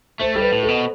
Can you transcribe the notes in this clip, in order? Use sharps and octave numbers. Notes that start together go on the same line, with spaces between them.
A3 C5
G3 A4
B4
A2
A4
B2